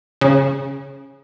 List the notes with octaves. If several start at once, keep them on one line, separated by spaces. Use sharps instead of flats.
C#3